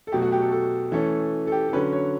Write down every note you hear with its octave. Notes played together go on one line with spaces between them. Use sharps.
A4
B2 F#3 A3 G4
F#4
G4
A4
A4
E3 A3 C#4 A4
A4
G4
A4
D3 F#3 C#4 B4
C#5